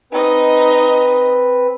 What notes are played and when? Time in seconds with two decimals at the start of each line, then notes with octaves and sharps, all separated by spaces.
0.12 C4 D#4 B4 D#5